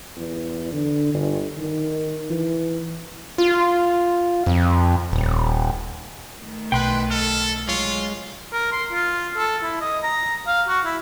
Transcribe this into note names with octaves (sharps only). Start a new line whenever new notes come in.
E2
D3
G1
D#3
E3
F4
F2
D#1
D#3 A3
B1 B4 G5 C6 F#6
A4 F6
F#3 G#3 F4 C#5
A#4
C6
F4
A4
E4
D#5
A#5
F5
F#4
E4